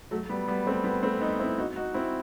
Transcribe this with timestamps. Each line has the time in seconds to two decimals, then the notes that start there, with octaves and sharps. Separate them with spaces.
0.11 F#3 A3
0.29 G3 B3
0.48 G3 B3
0.66 A3 C4
0.84 G3 B3
1.03 A3 C4
1.21 B3 D#4
1.39 C4 E4
1.58 D#4 F#4
1.76 D#4 F#4
1.94 C4 E4